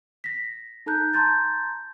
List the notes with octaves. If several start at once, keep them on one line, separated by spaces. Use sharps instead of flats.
A#6 B6
D#4 A4 A5 A#5 F#6 G6
A5 A#5 C6 G6 A6